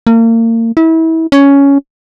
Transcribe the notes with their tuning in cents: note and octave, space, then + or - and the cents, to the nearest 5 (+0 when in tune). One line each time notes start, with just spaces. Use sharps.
A#3 -35
E4 -30
C#4 +10